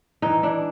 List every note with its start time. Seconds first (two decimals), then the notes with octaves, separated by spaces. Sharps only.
0.22 E3 D#4
0.43 E3 D4